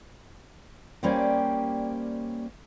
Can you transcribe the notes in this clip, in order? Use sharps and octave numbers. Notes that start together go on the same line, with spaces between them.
G3 A#3 C#4 G4 C5 D5